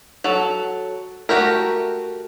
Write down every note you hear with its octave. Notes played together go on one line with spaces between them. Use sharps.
F#3 A4
A3 F#4 G4 A#4